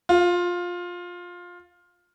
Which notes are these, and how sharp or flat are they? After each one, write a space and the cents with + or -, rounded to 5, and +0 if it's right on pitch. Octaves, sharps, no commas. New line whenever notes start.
F4 +15